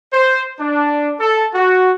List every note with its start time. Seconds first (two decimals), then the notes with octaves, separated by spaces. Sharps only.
0.13 C5
0.60 D4
1.20 A4
1.55 F#4